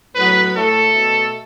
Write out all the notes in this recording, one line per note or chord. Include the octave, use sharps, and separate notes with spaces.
A2 F#3 B3 B4
A2 A3 A4
B2 A3